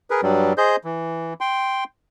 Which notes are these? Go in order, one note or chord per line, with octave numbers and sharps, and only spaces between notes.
G#4 A#4 B4
G2 F#3 G3
G#4 C5 D#5 G6
E3
G5 C6